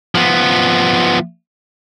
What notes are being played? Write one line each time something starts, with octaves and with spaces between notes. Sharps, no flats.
F3 B3